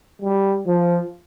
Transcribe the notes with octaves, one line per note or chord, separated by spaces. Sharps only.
G3
F3